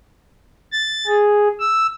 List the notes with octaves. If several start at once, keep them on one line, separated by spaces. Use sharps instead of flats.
A6
G#4
E6